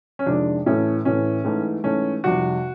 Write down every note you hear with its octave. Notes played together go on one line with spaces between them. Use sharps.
C#4
F2 C3 D#3 G#3 D4
A2 E3 A3 C#4
A2 E3 A3 C#4
G#2 E3 A3
G#2 E3 A3 C#4
F2 C3 D#3 G3 F#4